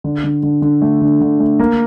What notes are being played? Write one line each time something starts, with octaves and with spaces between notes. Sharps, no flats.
D3
D3
D3
D3
A3
D3
D3
A3
A#3